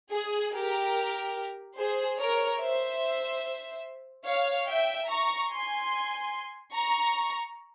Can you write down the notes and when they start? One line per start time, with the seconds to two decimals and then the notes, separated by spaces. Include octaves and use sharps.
0.12 G#4
0.53 G4 A#4
1.77 G#4 C5
2.19 A#4 C#5
2.60 C5 E5
4.26 C#5 F5
4.68 E5 G5
5.09 A#5 C#6
5.51 G#5 C6
6.75 A#5 C#6